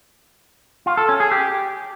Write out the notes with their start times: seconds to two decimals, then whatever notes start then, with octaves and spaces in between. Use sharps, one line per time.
0.86 F4
0.97 A4
1.09 C#4
1.20 G#4
1.32 G4